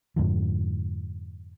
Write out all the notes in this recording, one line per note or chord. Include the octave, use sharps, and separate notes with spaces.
F2 G#2 D3 F3